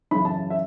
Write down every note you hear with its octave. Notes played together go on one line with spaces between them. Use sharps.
F#2 C#3 E3 B5
A5
E5